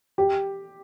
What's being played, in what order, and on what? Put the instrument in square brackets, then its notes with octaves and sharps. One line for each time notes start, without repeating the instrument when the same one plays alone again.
[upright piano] G4